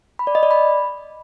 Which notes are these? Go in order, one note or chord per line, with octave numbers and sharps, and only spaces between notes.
B5
D5
D#5
D5
B5